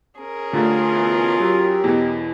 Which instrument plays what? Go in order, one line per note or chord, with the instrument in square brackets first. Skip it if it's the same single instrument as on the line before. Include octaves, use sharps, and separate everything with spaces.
[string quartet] C#4 G#4 A#4
[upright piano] D3 A3 [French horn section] G3 A#3 [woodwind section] F4
[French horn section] B2 E3 B3
[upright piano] F#3 [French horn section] G4
[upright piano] E2 B2 E3